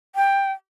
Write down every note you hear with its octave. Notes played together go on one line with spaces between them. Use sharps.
G5